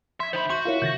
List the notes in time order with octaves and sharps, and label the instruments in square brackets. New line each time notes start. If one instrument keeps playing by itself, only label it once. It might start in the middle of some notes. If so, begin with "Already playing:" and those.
[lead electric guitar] E5 [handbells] C6 G#6
[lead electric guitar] D#3 B5 [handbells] C5 [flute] E5 [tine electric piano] C6 G6
[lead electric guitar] F#4 [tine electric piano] C6 G6
[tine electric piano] E4 F5 [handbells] F4 A#4 C#5 [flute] E5
[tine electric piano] C3 D#3 A#6 [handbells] G6 A6